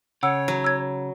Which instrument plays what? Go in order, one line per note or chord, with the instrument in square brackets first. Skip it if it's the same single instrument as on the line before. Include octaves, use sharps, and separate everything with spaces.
[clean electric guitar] C#3 [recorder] C#5 [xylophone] F#5 E6
[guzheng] F#3
[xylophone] E6 G#6